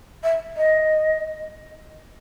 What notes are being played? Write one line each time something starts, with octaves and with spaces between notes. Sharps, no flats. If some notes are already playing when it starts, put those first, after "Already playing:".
E5
D#5